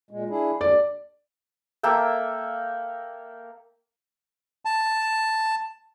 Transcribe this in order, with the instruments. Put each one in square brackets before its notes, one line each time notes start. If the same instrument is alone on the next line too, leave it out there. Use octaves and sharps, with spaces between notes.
[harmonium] A#2 G#3
D4 E4 G#4
[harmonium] D#2 D3 D4 [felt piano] D5
[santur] A#3 A4 E5 G5
[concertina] A5